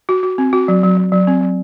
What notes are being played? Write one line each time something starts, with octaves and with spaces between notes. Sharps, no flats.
F#4
F#4
C4
F#4
F#3
F#3
F#3
F#3
C4
F#3